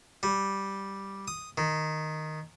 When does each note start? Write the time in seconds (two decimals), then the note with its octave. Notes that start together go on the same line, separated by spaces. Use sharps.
0.23 G3
1.28 D#6
1.58 D#3